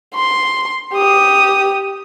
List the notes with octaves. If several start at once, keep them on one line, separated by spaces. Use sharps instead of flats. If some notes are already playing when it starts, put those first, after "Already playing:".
C6
G4 D#6